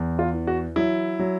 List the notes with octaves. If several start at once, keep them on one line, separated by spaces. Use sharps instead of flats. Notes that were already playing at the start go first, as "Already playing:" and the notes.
Already playing: E2
F4
E3
F#4
F#3 E4
F#3